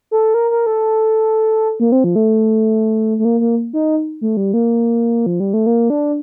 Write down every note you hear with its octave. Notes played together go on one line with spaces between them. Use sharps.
A4
A#4
A#4
A4
A#3
C4
F3
A3
A3
A#3
A#3
D#4
A3
G3
A#3
F3
G3
A3
A#3
D4